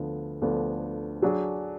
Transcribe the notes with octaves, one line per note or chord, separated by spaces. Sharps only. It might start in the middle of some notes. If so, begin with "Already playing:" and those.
Already playing: D2 D3 F3 B3 D4
D2 D3 F3 B3 D4
F#3 D4 G#4